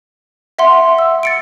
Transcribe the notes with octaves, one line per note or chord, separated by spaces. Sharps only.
E5 F#5 C6
E6
A6 C#7 D7